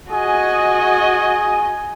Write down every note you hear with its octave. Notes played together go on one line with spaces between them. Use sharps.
F#4 G#4 D#5 G#5